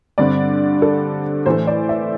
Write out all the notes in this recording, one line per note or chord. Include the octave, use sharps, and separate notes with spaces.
G2 D3 C4 D5
A4
A2 E3 A3 C5
D5
E5